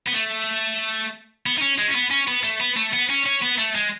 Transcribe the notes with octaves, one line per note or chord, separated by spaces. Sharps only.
B3
A3
B3
D#4
C#4
G#3
C#4
B3
C#4
B3
A3
B3
A3
B3
C#4
C#4
B3
A3
G#3